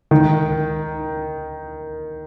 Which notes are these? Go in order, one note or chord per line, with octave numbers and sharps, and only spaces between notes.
D#3